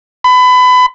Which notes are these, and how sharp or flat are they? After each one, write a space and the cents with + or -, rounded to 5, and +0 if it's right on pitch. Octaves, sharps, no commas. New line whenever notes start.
B5 +25